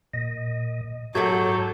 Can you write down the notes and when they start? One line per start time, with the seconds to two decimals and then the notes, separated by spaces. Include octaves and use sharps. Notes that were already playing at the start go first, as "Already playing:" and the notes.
0.14 A#2 D#5
1.15 G#2 F#3 G4 A4 C#5 E5 F#5 G6